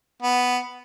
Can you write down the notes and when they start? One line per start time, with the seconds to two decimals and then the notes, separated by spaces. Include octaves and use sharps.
0.22 B3